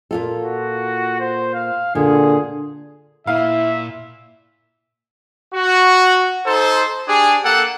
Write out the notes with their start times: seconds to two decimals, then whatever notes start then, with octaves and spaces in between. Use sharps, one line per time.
0.11 A#2 F4 A4
0.43 F#4
1.20 C5
1.54 F5
1.95 A#2 D3 G#4
3.27 A#2 E4 E5 F5
5.54 F#4
6.46 D#4 A4 C5
7.07 D4 G4 G#4
7.43 A#3 A4 F#5 G5